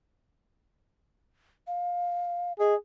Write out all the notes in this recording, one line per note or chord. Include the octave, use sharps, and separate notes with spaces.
F5
G#4 D#5